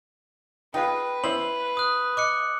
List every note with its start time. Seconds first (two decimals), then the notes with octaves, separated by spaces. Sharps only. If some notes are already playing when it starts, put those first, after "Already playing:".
0.74 D#4 F4 G#4 B4 G5
1.24 C#4 E4 C5 F#7
1.77 D#6 F#6
2.17 D#5 D6 F#6 C#7